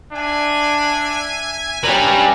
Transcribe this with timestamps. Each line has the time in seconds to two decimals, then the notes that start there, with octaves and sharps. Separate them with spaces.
0.12 D4 E5 G#5
1.84 G3 C#4 B4 D5 A#5